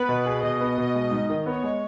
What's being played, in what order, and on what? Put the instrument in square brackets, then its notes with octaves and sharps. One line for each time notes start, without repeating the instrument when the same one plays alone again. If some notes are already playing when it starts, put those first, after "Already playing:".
Already playing: [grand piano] B3 [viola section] B4
[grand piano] B2
G#4
[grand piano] B2 [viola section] D#5
[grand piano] B3
B2
G#3
G#2
D#3
[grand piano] B3 [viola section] C#5
[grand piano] G#3